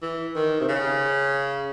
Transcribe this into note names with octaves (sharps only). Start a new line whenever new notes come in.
E3
D#3
C3
C#3